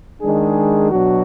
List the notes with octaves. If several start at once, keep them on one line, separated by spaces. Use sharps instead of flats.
D#3 G#3 D4 G#4
B2 F#3 D4 F#4